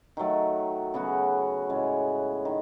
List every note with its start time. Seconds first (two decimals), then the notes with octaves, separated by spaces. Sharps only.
0.17 D#3 F#3 A3
0.94 C#3 F#3 B3 F#4
1.70 A2 G#3 C#4
2.45 D#3